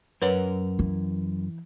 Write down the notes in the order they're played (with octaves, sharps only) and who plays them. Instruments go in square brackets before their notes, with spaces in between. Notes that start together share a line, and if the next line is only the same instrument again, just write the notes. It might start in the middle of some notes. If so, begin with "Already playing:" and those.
[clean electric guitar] F#2 A#4 F#5 [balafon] B4 C#5
[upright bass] E3